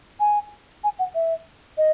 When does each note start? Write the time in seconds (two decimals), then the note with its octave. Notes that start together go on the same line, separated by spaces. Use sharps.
0.20 G#5
0.84 G#5
0.99 F#5
1.15 E5
1.78 D#5